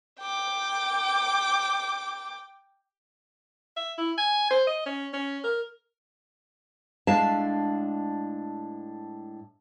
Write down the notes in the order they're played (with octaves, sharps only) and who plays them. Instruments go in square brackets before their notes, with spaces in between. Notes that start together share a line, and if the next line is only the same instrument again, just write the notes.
[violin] G5 D6
[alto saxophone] E5
E4
G#5
C5
D#5
C#4
C#4
A#4
[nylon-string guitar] A2 G#3 D4 E5 F5 A5